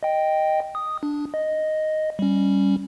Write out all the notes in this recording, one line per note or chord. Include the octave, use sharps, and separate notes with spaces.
D#5 G5
D#6
D4
D#5
G3 C#4